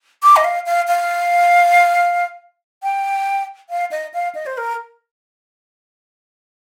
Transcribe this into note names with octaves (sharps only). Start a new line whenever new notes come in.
D6
D#5
F5
F5
F5
G5
F5
D#5
F5
D#5
C5
A#4